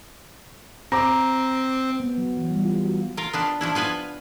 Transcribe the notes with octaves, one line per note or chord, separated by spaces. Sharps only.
C4 A#5 D6
B3
F#3
E3
G3
F4
F#4
F4 A#4
B3 D4 F4
F3 D4 E4
B3 F4 B4 G#5